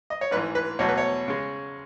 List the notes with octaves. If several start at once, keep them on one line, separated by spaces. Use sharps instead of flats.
D#5
C#5
A1 G#2 E3 B4
B4
E2 B2 F#3 A3 C#5
B4
C#5
C#3 G#3